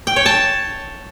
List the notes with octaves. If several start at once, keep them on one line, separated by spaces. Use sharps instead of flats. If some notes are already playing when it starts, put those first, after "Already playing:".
G5
C#5
A5